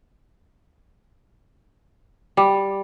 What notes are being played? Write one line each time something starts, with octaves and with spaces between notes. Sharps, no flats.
G3